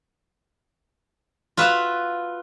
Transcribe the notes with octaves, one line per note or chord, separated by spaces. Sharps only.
F4 F#4 B4 E5